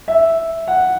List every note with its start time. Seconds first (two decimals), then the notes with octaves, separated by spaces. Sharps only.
0.08 E5
0.68 F#5